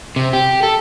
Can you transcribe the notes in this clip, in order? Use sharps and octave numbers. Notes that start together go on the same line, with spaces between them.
C3
G4
A4